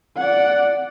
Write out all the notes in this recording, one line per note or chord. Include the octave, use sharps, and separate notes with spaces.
D5 F#5